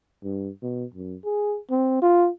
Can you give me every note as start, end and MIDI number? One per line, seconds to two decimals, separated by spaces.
0.23 0.49 43
0.63 0.85 47
0.94 1.16 42
1.25 1.58 68
1.70 1.97 60
2.02 2.29 65